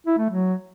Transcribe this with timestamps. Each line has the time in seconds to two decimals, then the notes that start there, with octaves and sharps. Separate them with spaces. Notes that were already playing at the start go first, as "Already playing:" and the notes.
0.07 E4
0.18 A3
0.30 F#3